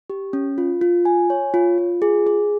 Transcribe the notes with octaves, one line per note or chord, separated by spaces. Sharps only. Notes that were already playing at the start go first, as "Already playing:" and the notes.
G4
C#4
F4
F4
G#5
C#5
F4
F4
G#4
G#4